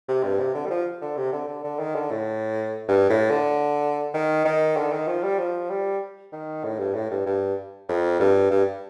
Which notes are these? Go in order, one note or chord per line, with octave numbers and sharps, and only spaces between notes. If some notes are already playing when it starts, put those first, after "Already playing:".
C3
G2
C3
D3
G3
F3
D3
C3
D3
D3
D3
D#3
D3
A2
G2
A2
D3
D#3
D#3
D3
D#3
F3
G3
F3
G3
D#3
A2
G2
A2
G2
G2
F2
G2
G2